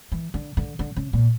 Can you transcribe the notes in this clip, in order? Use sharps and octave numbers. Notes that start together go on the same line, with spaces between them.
E3
D3
D3
D3
C#3
A#2